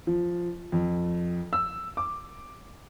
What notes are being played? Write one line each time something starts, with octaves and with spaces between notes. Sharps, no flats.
F3
F2
E6
D6